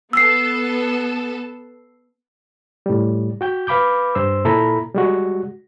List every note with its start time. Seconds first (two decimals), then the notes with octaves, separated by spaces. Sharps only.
0.13 B3 A4 E6 C7
2.86 A2 G3
3.41 F#4 G5 G6
3.67 B4 F5 B5 D6 G6
4.15 G2 C5 C6 E6
4.45 A#2 E4 A4 A#5 B5
4.94 G3 G#3 F#4